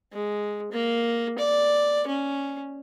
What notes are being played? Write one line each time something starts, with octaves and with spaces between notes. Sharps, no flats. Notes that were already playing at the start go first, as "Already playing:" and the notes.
G#3
A#3
D5
C#4